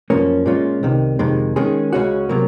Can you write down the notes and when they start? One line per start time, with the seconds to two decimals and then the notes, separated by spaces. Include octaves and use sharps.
0.10 F#2 F3 A#3 C#4
0.46 A#2 G#3 C#4 F4
0.83 C2 C3 D#3
1.19 F2 C3 D#3 G#3
1.56 D#3 G#3 C#4 G#4
1.93 C#2 C#3 G#3 C#4 F#4
2.29 C3 F#3 A#3